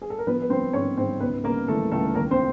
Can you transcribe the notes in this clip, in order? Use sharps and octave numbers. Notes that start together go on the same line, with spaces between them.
G#4
A4
A#4
F3 B3 B4
B4
F3 C4 C5
G#2 C#4 C#5
G#2 C4 C5
C#2 B3 B4
C#3 A#3 A#4
E3 A3 A4
C#2 A3 A4
D#2 A#3 A#4
C4 C5